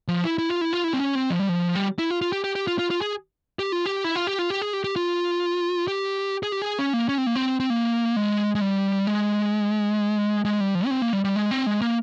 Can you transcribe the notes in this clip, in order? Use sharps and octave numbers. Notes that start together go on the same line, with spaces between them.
F3
E4
E4
F4
E4
F4
E4
C4
C#4
C4
F3
G3
F3
G3
E4
F4
F4
G4
G4
G4
F4
F4
F4
G#4
G4
F4
G4
E4
F4
G4
F4
G4
G#4
G4
G4
F4
G4
G#4
G4
G#4
C#4
A#3
C#4
C4
A#3
C4
C4
A#3
G#3
G#3
G3
G#3
G#3
G3
F3
C#4
C4
A#3
G3
G3
G#3
C4
G#3
A#3